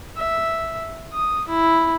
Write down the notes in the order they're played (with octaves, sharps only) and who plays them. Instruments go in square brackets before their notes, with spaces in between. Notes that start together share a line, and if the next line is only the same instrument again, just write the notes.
[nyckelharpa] E5
D#6
E4